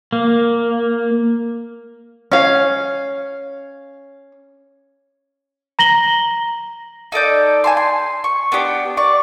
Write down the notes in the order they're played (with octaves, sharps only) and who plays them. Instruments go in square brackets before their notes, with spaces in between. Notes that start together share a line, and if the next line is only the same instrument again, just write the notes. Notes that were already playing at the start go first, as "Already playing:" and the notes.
[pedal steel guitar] A#3
[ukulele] C#4 F5
[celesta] A#5 A#6 F#7 G7
[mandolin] D#4 A4 D5 G6
G#5 A5 C6
C6
C#6
B3 D4 G4
D5 C#6